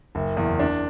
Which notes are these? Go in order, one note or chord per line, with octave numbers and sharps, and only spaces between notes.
F#1
E2
D4